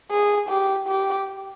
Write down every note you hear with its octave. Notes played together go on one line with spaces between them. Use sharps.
G#4
G4
G4